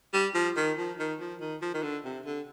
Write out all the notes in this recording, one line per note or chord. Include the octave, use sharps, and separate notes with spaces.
G3
F3
D#3
F3
D#3
F3
D#3
F3
D#3
D3
C3
D3